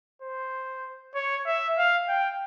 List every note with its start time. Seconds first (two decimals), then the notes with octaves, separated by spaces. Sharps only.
0.22 C5
1.15 C#5
1.46 E5
1.78 F5
2.09 G5